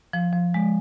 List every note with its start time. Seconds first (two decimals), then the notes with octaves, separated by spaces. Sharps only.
0.13 F3
0.33 F3
0.54 G#3